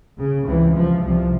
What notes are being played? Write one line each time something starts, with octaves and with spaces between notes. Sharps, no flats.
C#3
C#2 C3 E3
F3
C2 C3 F3